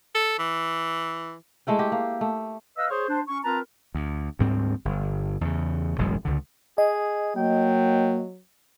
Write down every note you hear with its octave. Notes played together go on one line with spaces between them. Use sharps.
A4
E3
G#3 A3 E4 G5
G4
A#3
A3
B4 D#5 F5 E6
G#4 C5 C#5
D4 C5
C#4 C#6
C4 F4 A#4 B4 A5 A#5
D2
D2 G#2 G3 C4
G1
E2 C#3
E1 A1 F#2 G#3
C#2 D3
G#4 D#5
F#3 A#3 G5